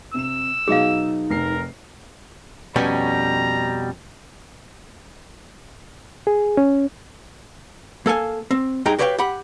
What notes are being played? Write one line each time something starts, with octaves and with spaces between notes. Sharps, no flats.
C3 E6 E7
B2 F#3 D#4 G#4 D#5 F5
F1 A#4 C7
F2 B2 G3 C#4 B4 A#5
G#4
C#4
A#3 A4 F5 G#5
C4
G2 G#3 D#4 G#4 G5 A#5
F#4 G4 B4 C#5 F5 G5
G4 F#5 B5